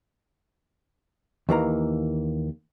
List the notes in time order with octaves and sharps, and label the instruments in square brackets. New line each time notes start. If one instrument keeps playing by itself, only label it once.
[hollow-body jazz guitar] D#2 E3 A#3 A#5